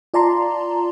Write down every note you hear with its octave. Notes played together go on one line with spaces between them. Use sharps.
F4 D5 A5 A#5 C6